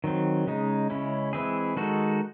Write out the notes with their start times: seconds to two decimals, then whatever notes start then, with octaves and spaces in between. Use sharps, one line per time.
0.04 D#3 F#3 C4
0.47 C#3 G#3 D#4
0.90 C#3 G#3 C#4 E4
1.33 E3 G#3 C4 E4 G#4
1.77 D#3 G#3 D#4 F#4 A4